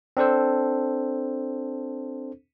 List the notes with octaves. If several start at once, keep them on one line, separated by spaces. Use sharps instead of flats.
C4 D4 A4 C5